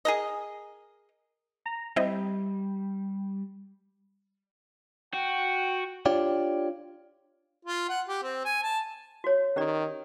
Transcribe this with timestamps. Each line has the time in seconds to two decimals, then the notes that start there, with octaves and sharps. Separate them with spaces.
0.05 G#4 A#4 D#5
1.66 A#5
1.96 G3 C4 E4 D#5
5.14 F#4 G5
6.06 D4 F4 G4 C#5 D5
7.65 F4
7.89 F#5
8.08 G4
8.22 C4
8.45 G#5
8.63 A5
9.24 F#4 C#5
9.56 D#3 C#4 G4 D5